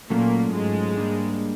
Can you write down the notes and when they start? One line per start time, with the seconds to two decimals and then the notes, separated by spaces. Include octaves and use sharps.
0.10 A#2 F#3 A3 A#3 C#4 F4 A4
0.54 G#2 G#3
0.97 G3 A#3 D4